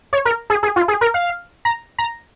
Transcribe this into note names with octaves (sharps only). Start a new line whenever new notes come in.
C#5
A#4
G#4
G#4
F4
G#4
A#4
F5
A#5
A#5